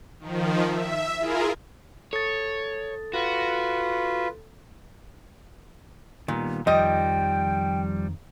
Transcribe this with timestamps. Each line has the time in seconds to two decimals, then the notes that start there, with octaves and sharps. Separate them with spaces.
0.20 D#3 F3
0.68 E5
1.18 E4 F4 G#4 A#4
2.13 A4 C#5 A6
3.14 F4 F#4 B4
6.28 A#2 D#3 G3 B3
6.67 F2 D#3 F3 G3 D#5 G5